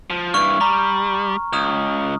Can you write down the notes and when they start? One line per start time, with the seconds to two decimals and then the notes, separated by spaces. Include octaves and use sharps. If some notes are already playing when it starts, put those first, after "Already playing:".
0.10 F3
0.34 G2 E3 C#6 F6
0.61 G3 A#5
1.53 C#2 D#6 F6